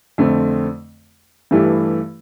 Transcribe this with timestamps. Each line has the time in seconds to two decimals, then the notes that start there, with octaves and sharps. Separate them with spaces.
0.18 F2 D3 A3 C4
1.51 G2 E3 A3 E4 G4